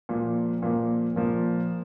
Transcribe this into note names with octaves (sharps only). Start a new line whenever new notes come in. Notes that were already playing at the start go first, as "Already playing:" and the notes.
A#2 F3 A#3
A#2 F3 A#3
A#2 F3 A#3